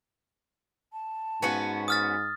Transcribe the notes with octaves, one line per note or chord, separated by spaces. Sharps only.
A5
G#2 B3 C#4 F#4
D#6 F6 A6